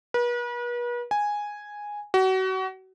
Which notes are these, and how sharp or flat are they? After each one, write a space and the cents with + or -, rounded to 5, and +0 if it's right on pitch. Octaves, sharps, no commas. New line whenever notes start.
B4 -40
G#5 -5
F#4 +30